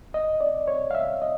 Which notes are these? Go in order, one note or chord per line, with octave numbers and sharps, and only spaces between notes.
D#5
D5
C#5
F5
E5
D#5